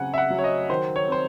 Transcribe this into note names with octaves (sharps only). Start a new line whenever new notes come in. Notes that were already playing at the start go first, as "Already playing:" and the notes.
Already playing: C#3 F#3 C4 F#5 G#5
E5
F#5
F#3
C#5
D#5
D#3 C5
C#5
C4 C5